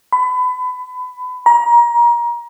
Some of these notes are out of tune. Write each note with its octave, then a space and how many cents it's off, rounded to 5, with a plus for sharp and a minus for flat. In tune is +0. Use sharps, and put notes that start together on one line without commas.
B5 +25
A#5 +30